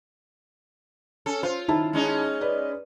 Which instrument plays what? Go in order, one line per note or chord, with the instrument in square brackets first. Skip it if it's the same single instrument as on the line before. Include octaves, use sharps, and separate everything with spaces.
[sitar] C#4 A4
[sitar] F4 [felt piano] C5
[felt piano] D#3 E4 A5
[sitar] G#3 C#4 D#4
[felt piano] B4 D5